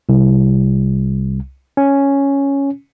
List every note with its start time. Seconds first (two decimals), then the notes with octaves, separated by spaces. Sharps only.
0.09 C2
1.77 C#4